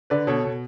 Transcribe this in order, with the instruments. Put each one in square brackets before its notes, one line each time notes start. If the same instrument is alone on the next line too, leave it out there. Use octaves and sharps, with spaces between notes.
[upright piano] D3 B4 D5
B2 A4 C#5
B2